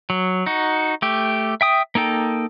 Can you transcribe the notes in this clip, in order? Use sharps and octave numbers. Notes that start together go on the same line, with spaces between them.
F#3
D#4 F#4
A3 G4
E5 G5 D#6
A#3 D#4 A4 G5